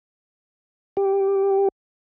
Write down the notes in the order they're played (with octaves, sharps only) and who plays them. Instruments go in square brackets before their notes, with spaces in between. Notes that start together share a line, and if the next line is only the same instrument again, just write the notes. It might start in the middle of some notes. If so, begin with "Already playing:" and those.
[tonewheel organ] G4